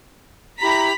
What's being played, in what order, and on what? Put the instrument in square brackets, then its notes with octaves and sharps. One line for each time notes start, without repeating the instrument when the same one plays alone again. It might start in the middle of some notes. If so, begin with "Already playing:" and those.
[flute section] E4 G4 [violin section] A#5 B5 B6